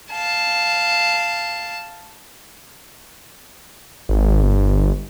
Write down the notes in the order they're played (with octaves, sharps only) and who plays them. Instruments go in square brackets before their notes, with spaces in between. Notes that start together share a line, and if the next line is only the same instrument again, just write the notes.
[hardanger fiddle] F5 A5
[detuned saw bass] G#1
G1